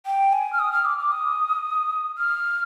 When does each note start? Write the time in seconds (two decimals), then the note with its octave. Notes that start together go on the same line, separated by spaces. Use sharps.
0.06 G5
0.33 G#5
0.53 F6
0.59 D#6
0.73 F6
0.85 D6
0.99 D6
1.12 D#6
2.18 F6